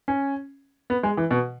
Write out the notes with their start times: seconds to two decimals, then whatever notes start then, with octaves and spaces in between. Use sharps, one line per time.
0.08 C#4
0.90 B3
1.03 G#3
1.17 E3
1.31 B2